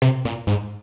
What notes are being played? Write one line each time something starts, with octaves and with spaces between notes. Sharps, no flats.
C3
A#2
G#2